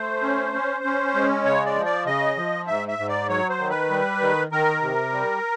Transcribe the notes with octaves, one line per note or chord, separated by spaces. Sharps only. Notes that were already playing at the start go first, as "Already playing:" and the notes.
Already playing: A3 C5
C#4
C#4
C#4
G#3
C#3 C#5
D5
F3
D5
C#3 D#5
F3
G#2 E5
E5
G#2
D5
F#3 C#5
C5
D#3
B4
G3
D#3
D#3 A#4
C3
G3